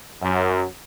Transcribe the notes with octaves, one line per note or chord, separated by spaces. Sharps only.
F#2